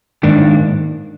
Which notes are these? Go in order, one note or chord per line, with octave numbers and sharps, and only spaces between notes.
G#2 D#3 A#3 D4